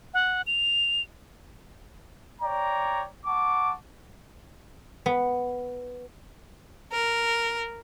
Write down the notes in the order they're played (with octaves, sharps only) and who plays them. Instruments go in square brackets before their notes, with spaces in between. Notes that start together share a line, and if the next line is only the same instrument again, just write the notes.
[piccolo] F#5
F7
[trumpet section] C#5 D5 G5 A#5
F#5 A5 C#6 D6
[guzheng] B3
[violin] A#4